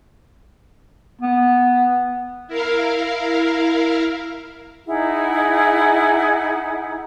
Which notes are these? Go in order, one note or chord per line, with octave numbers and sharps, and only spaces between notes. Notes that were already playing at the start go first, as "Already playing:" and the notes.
B3
E4 A#4 F5
D#4 E4 G#4 F#5